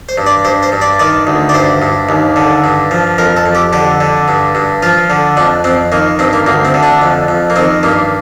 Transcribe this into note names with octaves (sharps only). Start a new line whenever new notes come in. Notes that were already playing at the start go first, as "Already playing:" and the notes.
C5
G2
D5
G2 C5
C5
G2
D5
D#3 D5
D2
D5
G2 C5
G2
D#2
D3
G2
F3
F2 A#4
A4
F2
G4
D3 G4
D3
G2
G2
F3 F4
D3
F2 D4
F2 C4
D#3 A#3
G2 C4
A#3
D2 A#3
C4
D3
D4
F2
F2
A#3
D#3 C4
G2 A#3